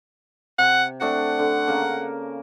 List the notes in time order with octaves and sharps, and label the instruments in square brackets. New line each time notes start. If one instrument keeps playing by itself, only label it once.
[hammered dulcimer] C3 [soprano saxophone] F#5
[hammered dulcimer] C3 A3 D4 [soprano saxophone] F#5
[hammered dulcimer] D3
C#3 A#3 A#4